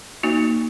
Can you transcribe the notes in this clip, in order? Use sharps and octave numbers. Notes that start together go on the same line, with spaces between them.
A#3 D#4 F#4